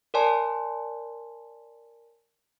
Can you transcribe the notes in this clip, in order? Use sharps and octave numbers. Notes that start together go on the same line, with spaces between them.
A#4 C#5 D5 G#5 A5 C6